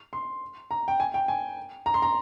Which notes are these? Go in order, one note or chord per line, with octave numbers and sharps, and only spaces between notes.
C6
A#5
G5
G#5
G5
G#5
A#5
C6
A#5